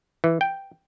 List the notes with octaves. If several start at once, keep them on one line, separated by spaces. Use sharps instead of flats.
E3
G5